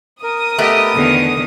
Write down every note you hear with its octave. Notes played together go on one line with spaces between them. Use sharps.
A#4 D#6
A3 B3 G4 D#5
E2 D3 D#3